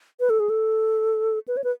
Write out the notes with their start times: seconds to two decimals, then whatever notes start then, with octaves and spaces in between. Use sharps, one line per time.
0.20 B4
0.30 A4
0.40 G#4
0.50 A4
1.48 B4
1.57 C#5
1.64 B4